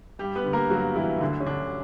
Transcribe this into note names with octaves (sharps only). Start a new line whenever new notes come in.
G2 G3 G4
B3 B4
D3
A#3 A#4
G2 F#3 F#4
E3 F#3 E4
D2 D3 D4
C#4
D3 D4